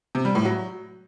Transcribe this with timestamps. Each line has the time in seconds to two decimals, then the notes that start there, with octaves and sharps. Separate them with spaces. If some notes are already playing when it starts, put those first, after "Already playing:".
0.15 C3
0.25 G3
0.35 A2
0.45 F#3